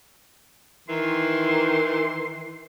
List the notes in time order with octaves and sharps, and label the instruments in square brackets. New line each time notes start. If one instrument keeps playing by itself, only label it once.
[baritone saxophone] D#3 [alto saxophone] E3 [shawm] C6